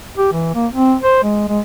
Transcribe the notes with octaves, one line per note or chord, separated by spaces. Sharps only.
G4
E3
A#3
C4
C5
G#3
G#3